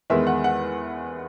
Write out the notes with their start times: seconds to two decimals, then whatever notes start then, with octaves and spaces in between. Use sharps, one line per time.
0.10 E2 D#3 G#3 B3 E5
0.27 F#5
0.44 F#5